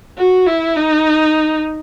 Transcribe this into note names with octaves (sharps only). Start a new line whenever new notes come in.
F#4
E4
D#4